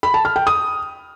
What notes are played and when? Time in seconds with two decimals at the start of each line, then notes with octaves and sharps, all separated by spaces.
0.03 B5
0.14 A5
0.25 F6
0.36 G5
0.47 D#6